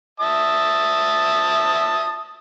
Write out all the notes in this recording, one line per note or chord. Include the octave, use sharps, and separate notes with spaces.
E5 A5 D#6